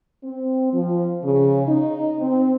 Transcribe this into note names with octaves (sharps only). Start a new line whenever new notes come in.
C4
F3
C#3
D#4
C4